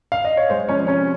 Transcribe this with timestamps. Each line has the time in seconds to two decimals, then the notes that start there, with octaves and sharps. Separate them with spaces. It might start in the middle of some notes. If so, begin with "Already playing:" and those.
0.12 F5
0.25 D#5
0.37 C#5
0.50 G#3 C5
0.69 F3 C#4 C#5
0.87 C3 C#4 C#5